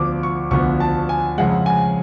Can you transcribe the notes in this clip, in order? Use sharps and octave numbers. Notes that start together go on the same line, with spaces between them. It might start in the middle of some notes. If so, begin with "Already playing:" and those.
Already playing: D2 D3 F3 B3 D6
C#6
D2 D3 F3 B3 C#6
A5
G#5
F2 C#3 G#3 F#5
G#5